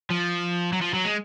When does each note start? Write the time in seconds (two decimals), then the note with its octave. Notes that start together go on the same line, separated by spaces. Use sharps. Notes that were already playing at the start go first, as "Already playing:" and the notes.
0.10 F3
0.73 F#3
0.82 F3
0.94 F#3
1.05 G#3